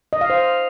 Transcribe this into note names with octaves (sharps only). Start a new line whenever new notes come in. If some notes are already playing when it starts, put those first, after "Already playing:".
D#5
F5
C5